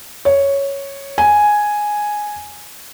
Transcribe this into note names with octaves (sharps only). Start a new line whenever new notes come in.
C#5
G#5